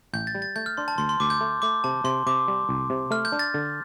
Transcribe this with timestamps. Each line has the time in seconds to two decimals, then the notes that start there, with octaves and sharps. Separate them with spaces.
0.13 A1 G6
0.27 A6
0.35 G3
0.42 A6
0.56 A3 G6
0.66 F6
0.77 D4 C6
0.88 A5
0.98 D2 C6
1.09 C6
1.20 D2 D6
1.30 G6
1.41 A3
1.62 A3 D6
1.84 C3 A5
2.04 C3 C6
2.27 C3 D6
2.48 G3
2.69 C2
2.90 C3
3.11 A3 F6
3.25 G6
3.32 D4
3.39 A6
3.54 D3